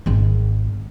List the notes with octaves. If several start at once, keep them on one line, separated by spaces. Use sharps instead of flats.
G#1 G#3